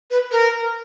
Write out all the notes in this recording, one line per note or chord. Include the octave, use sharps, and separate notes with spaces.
B4
A#4